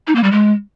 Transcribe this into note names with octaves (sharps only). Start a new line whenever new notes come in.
D#4
A#3
G3
G#3